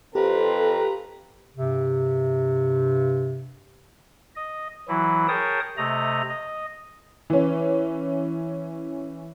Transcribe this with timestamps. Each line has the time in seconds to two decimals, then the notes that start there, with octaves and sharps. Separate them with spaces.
0.15 F2 C4 G4 A4 B4 A#5
1.56 G2 C3
4.36 D#5
4.88 E3 F#3 E4
5.28 G#4 A#4 C#5 G5 A5 D#6
5.77 C3 A3 D#5 A#5
6.29 D#5
7.30 E3 C#4